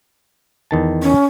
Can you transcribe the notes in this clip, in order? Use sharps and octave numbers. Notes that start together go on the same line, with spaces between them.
E2 D#3 A5
C#4